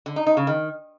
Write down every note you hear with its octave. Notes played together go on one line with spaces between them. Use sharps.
D3
D#4
D#4
C#3
D#3